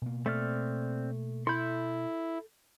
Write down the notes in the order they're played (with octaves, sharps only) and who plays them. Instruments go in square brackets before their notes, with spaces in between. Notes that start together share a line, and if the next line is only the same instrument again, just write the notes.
[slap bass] B2 A#3
[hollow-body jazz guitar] A3 [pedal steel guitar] C4 D5 F6
[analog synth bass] E4 [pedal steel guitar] A4 G6 [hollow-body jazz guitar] B5 C6